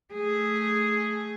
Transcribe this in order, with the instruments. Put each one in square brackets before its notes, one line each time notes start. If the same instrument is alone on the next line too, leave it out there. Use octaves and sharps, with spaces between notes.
[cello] A3 G#4